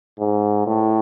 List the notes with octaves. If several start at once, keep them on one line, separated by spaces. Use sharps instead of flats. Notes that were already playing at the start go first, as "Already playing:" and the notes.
G#2
A2